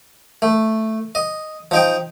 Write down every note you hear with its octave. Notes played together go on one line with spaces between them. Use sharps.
A3
D#5
F3 D#4 G5